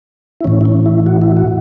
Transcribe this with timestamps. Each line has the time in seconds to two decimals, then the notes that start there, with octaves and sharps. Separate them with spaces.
0.41 E4
0.44 A2 E3 C#4
0.61 E4
0.65 C#4
0.86 E4
1.06 F#4
1.22 E4
1.37 F#4